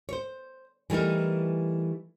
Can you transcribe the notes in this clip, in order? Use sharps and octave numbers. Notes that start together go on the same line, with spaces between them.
C5 C#5
E3 G3 A3 D#4 A#4